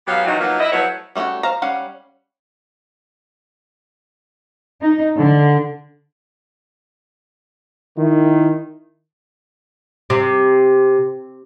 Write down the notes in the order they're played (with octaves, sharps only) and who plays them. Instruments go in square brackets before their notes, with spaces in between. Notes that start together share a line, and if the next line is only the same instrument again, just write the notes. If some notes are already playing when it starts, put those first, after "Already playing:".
[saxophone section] G#2 F#3 B3 G4 F5
C3 E3 F#3 A3 D#4 F#4
F3 F#3 A#3 B3 D#4 F4
E4 D#5
F3 F#3 A3 B3 E4 C#5
[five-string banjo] G3 A3 C4 C#4 F#4
C5 F5 A#5
G3 C#4 F5 F#5
[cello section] D#4
D3
[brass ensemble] D#3 E4
[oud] C3